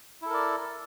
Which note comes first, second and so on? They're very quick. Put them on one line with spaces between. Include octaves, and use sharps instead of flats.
E4 A4 A#4 D5